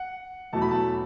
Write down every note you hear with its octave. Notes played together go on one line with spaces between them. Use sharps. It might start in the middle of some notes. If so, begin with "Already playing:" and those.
Already playing: F#5
E2 B2 F#3 A3 A5
B5
A5